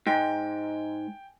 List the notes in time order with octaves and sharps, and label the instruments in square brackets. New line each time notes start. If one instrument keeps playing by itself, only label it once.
[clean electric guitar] G#2 [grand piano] G5 G#5